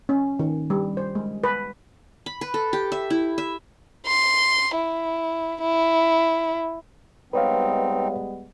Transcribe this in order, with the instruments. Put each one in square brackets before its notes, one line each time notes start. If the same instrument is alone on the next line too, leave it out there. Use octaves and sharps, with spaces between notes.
[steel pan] C#4
D#3
G3
C5
G#3
B4
[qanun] B5
B4
A4
G4
E5
E4
E5
[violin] C6
E4
E4
[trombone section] G3 G#3 B3 [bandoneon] C4 D#4 [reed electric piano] B4 C#5 F5